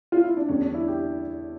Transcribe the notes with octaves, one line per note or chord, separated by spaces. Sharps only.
F4
E4
D4
E2 D3 G3 C#4
D4
E4
G4